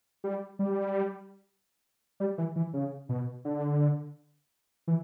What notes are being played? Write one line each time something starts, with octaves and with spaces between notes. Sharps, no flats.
G3
G3
G3
E3
E3
C#3
B2
D3
E3